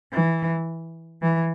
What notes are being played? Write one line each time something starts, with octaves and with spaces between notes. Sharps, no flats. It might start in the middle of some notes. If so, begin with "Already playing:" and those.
E3
E3